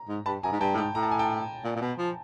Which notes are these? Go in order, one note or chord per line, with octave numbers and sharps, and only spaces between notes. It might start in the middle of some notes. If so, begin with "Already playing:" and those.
Already playing: A#5
G#2
G2 A5 B5
F#2 G#5 A#5
G#2
G2 G5 A5
A2
G#2 G5 A5
A2 A#5
A5
G#5
G5 A5
A#2
A#2
B2
F3